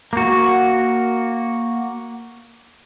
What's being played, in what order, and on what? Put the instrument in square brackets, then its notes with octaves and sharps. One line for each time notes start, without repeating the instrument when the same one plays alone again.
[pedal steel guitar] A#3 F#4